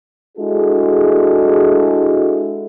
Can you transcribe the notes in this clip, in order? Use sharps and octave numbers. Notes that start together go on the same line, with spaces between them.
G#3 D4 E4 F#4 G#4 A4